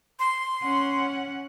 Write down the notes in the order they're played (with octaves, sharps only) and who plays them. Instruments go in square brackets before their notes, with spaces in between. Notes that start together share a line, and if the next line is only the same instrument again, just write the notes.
[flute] C6
[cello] C#4 F#5